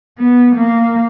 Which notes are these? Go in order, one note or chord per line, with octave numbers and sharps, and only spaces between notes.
B3
A#3